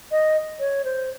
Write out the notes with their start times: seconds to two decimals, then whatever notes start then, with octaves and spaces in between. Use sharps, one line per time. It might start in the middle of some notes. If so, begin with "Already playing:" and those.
0.11 D#5
0.60 C#5
0.85 C5